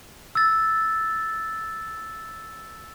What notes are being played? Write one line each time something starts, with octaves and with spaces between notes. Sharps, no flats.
E6 A6